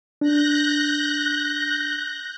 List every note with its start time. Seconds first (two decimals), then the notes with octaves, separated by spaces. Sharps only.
0.21 D4 F#6 G6 A#6